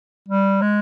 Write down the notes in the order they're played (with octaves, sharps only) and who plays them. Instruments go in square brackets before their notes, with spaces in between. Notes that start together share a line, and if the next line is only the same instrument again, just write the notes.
[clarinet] G3
G#3